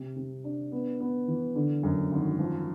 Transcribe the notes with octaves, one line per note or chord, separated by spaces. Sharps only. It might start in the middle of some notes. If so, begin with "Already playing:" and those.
Already playing: C3
C3
D4
B3
B3
E3
D3
F#2
G#1
F3